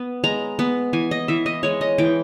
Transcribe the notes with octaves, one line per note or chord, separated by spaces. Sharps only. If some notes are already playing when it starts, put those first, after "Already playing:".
Already playing: B3
G#3 A#5
B3
E3 G#5
D#5
E3 E5
D#5
G#3 C#5
D#5
E3 G5